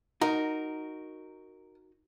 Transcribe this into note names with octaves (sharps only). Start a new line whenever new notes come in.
D#4 F#4 A#4